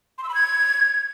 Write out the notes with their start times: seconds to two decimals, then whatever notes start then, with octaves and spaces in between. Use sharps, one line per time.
0.18 C6
0.24 E6
0.29 B5
0.34 G#6